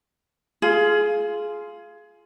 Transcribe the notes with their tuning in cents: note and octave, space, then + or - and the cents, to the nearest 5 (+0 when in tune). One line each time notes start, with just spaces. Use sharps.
F4 -10 G#4 +20